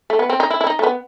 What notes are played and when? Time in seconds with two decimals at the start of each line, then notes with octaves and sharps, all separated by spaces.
0.10 A3
0.19 B3
0.29 C4
0.40 D#4
0.50 E4
0.61 E4
0.67 D#4
0.79 A3
0.83 B3